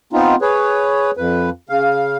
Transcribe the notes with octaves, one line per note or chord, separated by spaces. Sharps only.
B3 C4 D#4 F4
G#4 B4 C#5
F2 B4
C#3 F5